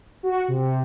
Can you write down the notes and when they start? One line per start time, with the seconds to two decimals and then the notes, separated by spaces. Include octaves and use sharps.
0.23 F#4
0.48 C3